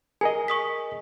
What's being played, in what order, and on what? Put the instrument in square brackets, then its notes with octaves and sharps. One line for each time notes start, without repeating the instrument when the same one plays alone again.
[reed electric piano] G#4 A#4 D#5 [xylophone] G#5
[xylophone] C#6 D#6 B6